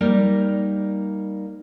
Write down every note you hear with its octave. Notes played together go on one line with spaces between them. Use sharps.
G3 A#3 D#4 A#4 C5 D5